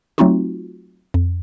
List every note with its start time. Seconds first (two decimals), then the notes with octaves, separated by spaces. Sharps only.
0.18 F#3 A3 C4 D#4 F4 F#4
1.14 F2